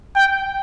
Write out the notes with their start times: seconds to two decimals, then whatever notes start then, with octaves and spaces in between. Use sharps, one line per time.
0.15 G5